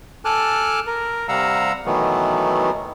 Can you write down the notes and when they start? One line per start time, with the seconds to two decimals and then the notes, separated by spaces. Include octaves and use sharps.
0.25 A4 G#5 A5 D6 F6 F#6
0.87 A#4
1.29 C3 G3 F5 F#5 A#5 E6
1.86 B2 D#3 E3 F#3 A3 B3